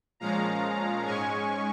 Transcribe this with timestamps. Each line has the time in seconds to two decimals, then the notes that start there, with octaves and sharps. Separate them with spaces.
0.20 A#2 F3 G#3 C#4 F5 A#5
1.05 G#2 G#3 C#4 G#5 C#6